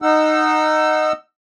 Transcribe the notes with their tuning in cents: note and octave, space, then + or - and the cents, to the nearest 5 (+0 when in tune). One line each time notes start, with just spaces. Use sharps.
D#4 -10 F#5 +0 E6 +15